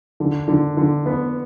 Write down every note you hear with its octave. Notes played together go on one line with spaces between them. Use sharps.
D3
D3
D3
B3